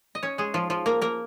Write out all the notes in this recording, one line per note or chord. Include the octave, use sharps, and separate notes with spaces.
D#5
C#4 C#5
G#3 G#4
F3 F4
F3 F4
A#3 A#4
A#3 A#4